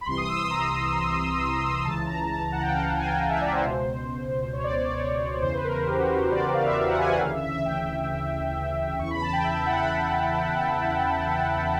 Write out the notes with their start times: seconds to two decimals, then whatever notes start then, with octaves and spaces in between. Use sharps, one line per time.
0.01 B5
0.06 C2 C3 E3 C6
0.17 D#6
0.28 E6
0.39 D#6
0.50 A#5
1.85 C#2 C#3 E3 A5
2.07 A#5
2.29 A5
2.52 F#5
2.62 G5
2.69 F5
2.74 F#5
2.85 G5
2.97 G#5
3.08 G5
3.29 E5
3.41 D5
3.52 C5
3.63 C#2 B2
4.53 C#5
4.64 D5
4.75 D5
4.86 D5
4.97 C#5
5.42 E2 C#3 E3 C5
5.54 B4
5.64 A#4
5.86 G4
5.98 F#4
6.09 G4
6.20 C5
6.32 D5
6.54 F5
6.65 E5
6.76 F5
6.88 F#5
6.98 G#5
7.10 F#5
7.21 D2 C#3 E3 F5
7.32 E5
7.43 E5
7.54 E5
7.65 G5
8.99 E2 C#3 E3 C#6
9.11 B5
9.22 A5
9.33 G5
9.44 E5
9.56 E5
9.66 F#5
9.78 B5